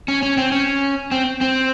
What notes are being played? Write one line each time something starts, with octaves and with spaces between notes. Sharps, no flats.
C#4
C#4
C4
C#4
C4
C4